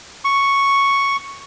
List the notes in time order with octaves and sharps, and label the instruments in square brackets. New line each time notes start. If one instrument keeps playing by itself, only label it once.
[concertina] C#6